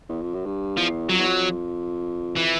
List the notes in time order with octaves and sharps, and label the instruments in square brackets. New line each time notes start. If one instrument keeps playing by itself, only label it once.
[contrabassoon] E2
F2
F#2
G2
[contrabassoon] E2 [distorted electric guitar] F3
[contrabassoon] F2 [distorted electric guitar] F#3
[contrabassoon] E2
F2
[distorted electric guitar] E3